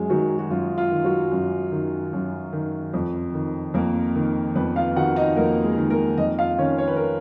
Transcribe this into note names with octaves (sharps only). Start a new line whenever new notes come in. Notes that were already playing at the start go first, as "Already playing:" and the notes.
Already playing: F#2 G#3 G#4
D#3 F#3 F#4
F#4
F#2 F4
F4
D#3
F#3 F#4
F#2
D#3
F#2
D#3
F2
D#3
F2 A#3 A#4
D#3
F2 B3 B4
F4 F5
D#3 F#4 F#5
D#4 D#5
F2 A#3 A#4
G#3 G#4
D#3
A#3 A#4
F2 D#4 D#5
F4 F5
D#3 C#4 C#5
C#5
B4
A#4